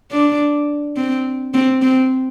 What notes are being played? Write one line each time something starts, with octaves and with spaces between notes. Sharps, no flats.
D4
C4
C4
C4